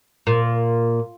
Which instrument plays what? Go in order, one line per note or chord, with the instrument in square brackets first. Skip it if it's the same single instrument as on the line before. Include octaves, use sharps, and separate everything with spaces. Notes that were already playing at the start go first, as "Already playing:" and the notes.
[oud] A#2